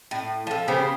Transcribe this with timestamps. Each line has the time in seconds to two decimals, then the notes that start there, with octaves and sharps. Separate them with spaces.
0.11 A2
0.47 F3 A4
0.68 C#3 B3 G4 C5